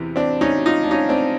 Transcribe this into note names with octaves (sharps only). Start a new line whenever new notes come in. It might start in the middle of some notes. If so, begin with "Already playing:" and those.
Already playing: E2 C3 E3
C4 D4
C#4 D#4
D#4 F4
D4
C#4 D#4
C4 D4